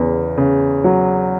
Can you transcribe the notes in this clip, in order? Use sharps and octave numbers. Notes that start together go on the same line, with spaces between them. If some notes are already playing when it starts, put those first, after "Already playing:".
Already playing: E2 C#3
C#3
F#3